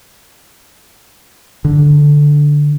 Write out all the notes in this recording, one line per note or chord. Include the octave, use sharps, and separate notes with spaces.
D3